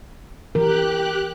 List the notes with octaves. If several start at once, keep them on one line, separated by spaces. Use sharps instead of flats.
E3 G4 A#4 F#6